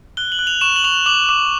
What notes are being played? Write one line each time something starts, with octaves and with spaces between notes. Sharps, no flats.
F#6 G7
F#7
F#6
F7
C#6 E7
F#7
C#6 F7
D6 F#7
D6